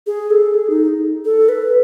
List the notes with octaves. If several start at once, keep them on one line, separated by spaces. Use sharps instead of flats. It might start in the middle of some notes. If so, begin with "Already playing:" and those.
G#4
A4
G#4
D#4
A4
B4